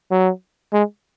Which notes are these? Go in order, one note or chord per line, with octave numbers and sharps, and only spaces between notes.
F#3
G#3